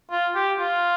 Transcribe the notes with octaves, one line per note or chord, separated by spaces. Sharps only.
F4
G4
F4